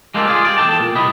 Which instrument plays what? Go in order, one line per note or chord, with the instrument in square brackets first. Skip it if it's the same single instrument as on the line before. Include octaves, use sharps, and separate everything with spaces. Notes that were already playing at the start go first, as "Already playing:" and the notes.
[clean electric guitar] G#3 A#3 C4 D4 F4 G4
F4 G#4 D5
G4 D5
E2 F#3 A4 G5 A5
A#2
C2 B3 E4 D#5 B5